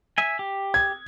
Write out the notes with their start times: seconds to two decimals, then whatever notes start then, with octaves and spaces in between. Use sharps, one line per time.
0.18 E5 G#5
0.39 G4
0.74 G#6